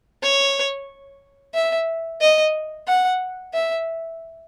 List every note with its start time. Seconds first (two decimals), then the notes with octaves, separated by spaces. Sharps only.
0.23 C#5
1.55 E5
2.21 D#5
2.88 F#5
3.54 E5